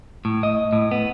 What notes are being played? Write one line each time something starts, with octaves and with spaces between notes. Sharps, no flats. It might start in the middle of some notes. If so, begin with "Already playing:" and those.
A2
D#5
A2
B3